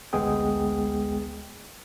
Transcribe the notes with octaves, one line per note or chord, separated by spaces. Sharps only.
A1 D2 G#3 B3 G#4 G5